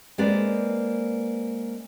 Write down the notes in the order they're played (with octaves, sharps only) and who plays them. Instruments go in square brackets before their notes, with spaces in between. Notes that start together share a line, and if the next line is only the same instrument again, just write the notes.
[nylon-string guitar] G#3 A#3 C4 B4 D5